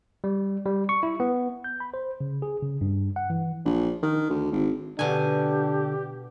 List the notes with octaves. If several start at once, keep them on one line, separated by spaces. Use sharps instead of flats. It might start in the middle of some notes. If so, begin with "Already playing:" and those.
G3
G3
C#6
E4
B3
G6
B5
C5
C#3
G#4
C#3
G2
F#5
E3
A#1
D#3
D2
G#1
B2 D3 D4 G4 G#5